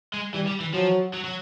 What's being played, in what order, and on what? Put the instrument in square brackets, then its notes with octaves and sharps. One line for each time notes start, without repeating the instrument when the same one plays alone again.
[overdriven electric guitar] G#3
[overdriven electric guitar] E3 [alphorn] G3
[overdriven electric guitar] G3
E3
[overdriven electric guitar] F3 [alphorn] F#3
[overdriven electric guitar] F#3
F#3